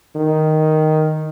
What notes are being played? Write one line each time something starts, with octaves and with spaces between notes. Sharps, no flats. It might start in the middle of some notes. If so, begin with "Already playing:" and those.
D#3